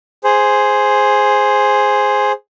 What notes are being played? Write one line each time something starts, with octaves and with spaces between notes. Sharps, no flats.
G#4 C5